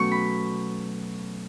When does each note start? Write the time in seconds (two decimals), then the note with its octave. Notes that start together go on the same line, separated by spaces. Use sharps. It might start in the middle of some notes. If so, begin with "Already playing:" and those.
Already playing: B2 F#3 A3 C#4 C#6
0.12 B5